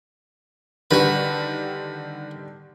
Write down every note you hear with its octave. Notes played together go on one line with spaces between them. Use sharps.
D3 D#3 G3 F#4 B4